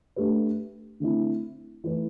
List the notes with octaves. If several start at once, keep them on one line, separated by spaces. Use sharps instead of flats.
A3 D4 G4 B4
D3 A3 C4 E4
E3 A3 E4 B4